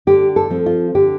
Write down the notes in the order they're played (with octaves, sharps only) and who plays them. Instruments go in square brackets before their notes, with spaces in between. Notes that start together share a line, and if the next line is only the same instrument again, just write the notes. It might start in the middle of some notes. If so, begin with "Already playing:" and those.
[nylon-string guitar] D3 G4
A4
F3 C4
F4
D3 G4